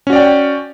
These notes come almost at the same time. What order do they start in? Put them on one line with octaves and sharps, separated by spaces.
C#4 F#4 D5 G5